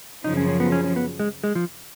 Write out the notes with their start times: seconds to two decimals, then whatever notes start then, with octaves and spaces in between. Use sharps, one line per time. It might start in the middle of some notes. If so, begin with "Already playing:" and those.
0.24 F#2 C#3 F3 D#4
0.37 C#4
0.48 C#4
0.60 B3
0.72 C#4
0.84 C#4
0.96 B3
1.19 G#3
1.44 G#3
1.55 F3